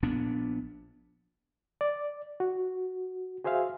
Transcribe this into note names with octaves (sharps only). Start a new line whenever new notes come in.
A#1 A#2 B3 D4
D5
F#4
F#4 G#4 C5 E5 F5